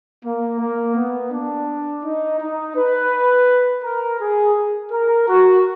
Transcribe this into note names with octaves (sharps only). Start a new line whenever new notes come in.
A#3
A#3
B3
D4
D#4
D#4
B4
A#4
G#4
A#4
F#4